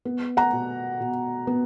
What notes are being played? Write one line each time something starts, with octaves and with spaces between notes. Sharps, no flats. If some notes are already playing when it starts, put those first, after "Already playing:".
B3
F#5 A#5
B2
B2
B3